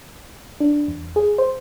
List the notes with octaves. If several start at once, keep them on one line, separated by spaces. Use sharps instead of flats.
D4
E2
G#4
C5